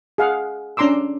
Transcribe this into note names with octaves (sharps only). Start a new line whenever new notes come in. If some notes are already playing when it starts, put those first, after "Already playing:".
G#4 F5 F#5
C#4 D4 A#5 C6 D6 E6